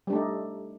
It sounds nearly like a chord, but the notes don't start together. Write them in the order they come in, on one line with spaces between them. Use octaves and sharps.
G3 D4 A3 D#4